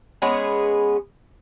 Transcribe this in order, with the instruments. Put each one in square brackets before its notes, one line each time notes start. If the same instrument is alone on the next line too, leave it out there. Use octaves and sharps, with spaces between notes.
[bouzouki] G#3 B3 C#4 G#4